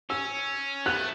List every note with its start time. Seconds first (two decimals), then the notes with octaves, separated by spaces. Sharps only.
0.10 C#4 E6
0.86 B3 F#6
0.97 A3